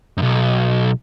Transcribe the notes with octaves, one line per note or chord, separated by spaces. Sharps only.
B1 F#2